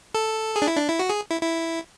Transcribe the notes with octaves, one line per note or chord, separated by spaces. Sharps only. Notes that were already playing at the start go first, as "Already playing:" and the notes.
A4
G#4
D4
E4
D4
E4
F#4
G#4
E4
E4